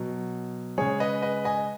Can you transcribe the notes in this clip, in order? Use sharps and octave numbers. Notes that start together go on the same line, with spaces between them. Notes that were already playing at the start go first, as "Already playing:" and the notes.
Already playing: B2 F#3
C#3 G#3 G#4 C#5
B4 D#5
B4 D#5
D#5 G#5